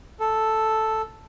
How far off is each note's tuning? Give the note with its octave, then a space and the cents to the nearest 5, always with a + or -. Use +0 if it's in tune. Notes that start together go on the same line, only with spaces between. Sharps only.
A4 +0